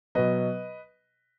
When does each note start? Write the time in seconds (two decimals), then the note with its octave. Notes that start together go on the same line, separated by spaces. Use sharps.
0.15 B2 F#3 B4 D#5